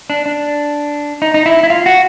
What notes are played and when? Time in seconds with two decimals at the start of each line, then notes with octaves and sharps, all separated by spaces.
0.10 D4
0.26 D4
1.22 D#4
1.34 D#4
1.46 E4
1.63 E4
1.70 F4
1.86 F#4